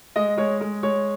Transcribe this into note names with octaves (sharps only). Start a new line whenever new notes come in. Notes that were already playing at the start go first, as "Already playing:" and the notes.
G#3 D#5
G#3 C#5
G#3
G#3 C#5